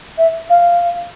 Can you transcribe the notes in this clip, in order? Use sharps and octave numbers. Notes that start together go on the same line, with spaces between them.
E5
F5